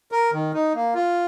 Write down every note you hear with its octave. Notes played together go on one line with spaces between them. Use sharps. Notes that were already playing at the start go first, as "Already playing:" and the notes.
A#4
D#3
D#4
A#3
F4